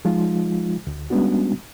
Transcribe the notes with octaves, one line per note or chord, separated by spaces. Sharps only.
F3 G#3 D#4 F4
D2
G3 G#3 B3 C#4 D4 F#4